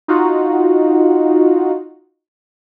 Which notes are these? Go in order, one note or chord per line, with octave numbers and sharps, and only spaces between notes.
D#4 F4 F#4